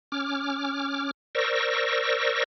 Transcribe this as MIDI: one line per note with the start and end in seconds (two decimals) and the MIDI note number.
0.12 1.11 61
0.12 1.11 86
0.12 1.11 89
1.35 2.44 70
1.35 2.44 72
1.35 2.44 74
1.35 2.44 85
1.35 2.44 88
1.35 2.44 94